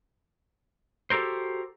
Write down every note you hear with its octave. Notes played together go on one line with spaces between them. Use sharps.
F#4 G4 A4 A#4 C5